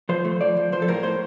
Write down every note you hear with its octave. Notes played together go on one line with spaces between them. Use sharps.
F3 C5
A3
F3 D5
F3
F3 C5
A4
A2 A#4
A2 C5